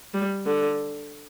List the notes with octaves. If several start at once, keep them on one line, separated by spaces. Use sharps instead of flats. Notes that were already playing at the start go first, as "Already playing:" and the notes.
G3
D3